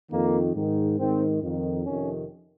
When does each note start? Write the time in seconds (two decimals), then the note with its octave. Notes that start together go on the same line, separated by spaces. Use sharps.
0.11 F2 D#3 A#3
0.54 G#2 D#3
0.98 G#2 D#3 C4
1.42 F2 D#3
1.85 F2 C3 D#3 C#4